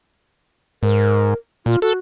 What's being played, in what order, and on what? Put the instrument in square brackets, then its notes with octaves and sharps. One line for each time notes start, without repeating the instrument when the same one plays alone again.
[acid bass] G#2 [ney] A#4
[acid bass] A#2 [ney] F4
[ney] F#4 [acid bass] A4